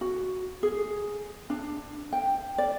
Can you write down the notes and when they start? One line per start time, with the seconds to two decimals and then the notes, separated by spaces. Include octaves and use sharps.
0.01 F#4
0.63 G#4
1.50 D4
2.13 G5
2.58 D5